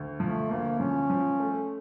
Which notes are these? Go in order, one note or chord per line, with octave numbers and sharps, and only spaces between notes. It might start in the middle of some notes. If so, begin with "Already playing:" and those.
Already playing: D2
F3 A3
D2 A#3
F3 C#4
F3
A3